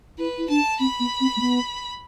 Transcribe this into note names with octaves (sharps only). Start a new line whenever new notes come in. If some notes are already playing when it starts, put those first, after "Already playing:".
E4 B4
E4
D4 A5
C4 B5
B3
C4
A3
B3